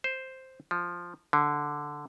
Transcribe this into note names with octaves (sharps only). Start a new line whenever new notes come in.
C5
F3
D3